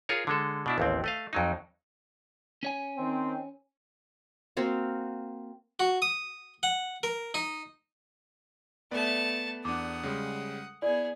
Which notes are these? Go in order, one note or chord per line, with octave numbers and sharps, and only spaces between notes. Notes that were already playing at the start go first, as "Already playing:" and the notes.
F4 G#4 A#4 C#5
D3 G#3 A4
B2 D4 E4
A1 D#2 C4
A3 D#5 F5
F2 F#3 D#4
C#4 C#5 G#5
D#3 C4
A#3 C4 F#4 F5
F#4
D#6
F#5
A#4
D#4
A3 B3 B4 D5 A5
E2 D4 F#5 D6 D#6
C#3 G3 G#3
B3 E4 G#4 D5